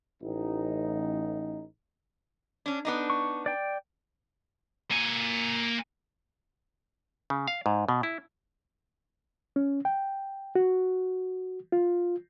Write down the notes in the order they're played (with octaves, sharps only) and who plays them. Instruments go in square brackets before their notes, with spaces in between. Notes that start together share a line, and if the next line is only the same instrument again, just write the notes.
[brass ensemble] A1 D#4
[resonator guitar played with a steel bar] C#4 D4
B3 D4 D#4
[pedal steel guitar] C#6
D5 G5
[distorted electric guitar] A#3 G#5
[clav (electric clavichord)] C#3
F5
G#2
B2
E4
[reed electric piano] C#4
G5
F#4
F4